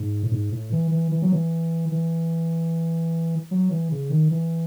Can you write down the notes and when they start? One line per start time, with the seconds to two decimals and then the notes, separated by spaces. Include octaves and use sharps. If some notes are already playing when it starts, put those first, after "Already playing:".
Already playing: G#2
0.23 A2
0.32 G#2
0.52 A2
0.72 E3
0.91 E3
1.12 E3
1.22 F#3
1.32 E3
1.92 E3
3.51 F#3
3.71 E3
3.91 C#3
4.10 D#3
4.31 E3